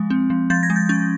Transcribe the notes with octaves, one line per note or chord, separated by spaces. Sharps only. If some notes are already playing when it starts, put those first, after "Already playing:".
Already playing: F3 G#3
C4
F3
F3 G6 A6
G#6 A#6
G#3
G6 A6
C#4 G6 A6